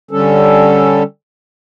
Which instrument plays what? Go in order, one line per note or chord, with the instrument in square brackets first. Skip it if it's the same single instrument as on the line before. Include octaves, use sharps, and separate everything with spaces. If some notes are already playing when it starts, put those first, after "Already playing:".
[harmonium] D3 G3 C#4 A4